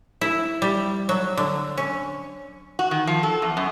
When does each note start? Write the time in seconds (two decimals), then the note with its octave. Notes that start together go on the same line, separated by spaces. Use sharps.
0.21 E4
0.62 G3
1.09 F#3
1.37 D3
1.77 C#4
2.79 F#4
2.91 D#3
3.07 F3
3.23 A4
3.42 E2
3.57 F#2